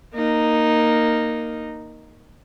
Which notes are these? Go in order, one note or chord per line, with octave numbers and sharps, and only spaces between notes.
A#3 D#4